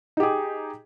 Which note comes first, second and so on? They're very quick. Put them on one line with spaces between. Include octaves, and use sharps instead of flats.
D#4 G4 G#4